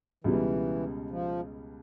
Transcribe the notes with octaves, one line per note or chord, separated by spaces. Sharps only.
C#2 B2 E3 G3
F3